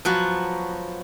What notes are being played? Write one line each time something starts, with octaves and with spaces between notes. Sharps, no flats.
F3 F#3 B3 F#4